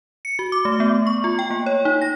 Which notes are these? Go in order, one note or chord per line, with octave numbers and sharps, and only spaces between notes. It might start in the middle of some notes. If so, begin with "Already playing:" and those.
C#7
F#4
D6
A3
B3
C#6
F4
G5
A#3
C#5
D#4
A#6